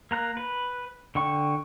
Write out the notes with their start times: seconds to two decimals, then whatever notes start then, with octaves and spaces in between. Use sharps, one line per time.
0.11 A#3 A#5 F#6
0.37 B4
1.15 D3 G5 C#6